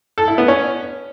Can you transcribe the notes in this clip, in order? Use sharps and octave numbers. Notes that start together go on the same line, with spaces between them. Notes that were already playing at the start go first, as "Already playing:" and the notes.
A4
E4
B3
C#4